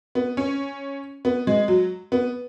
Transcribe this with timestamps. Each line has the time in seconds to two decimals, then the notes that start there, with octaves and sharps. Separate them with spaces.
0.15 B3
0.37 C#4
1.25 B3
1.47 G#3
1.68 F#3
2.12 B3